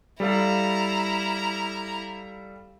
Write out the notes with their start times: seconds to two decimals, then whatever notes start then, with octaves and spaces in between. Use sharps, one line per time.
0.20 G3 E4 A4 F5 A#5